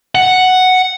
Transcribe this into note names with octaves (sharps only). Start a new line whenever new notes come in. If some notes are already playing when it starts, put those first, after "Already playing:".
F#5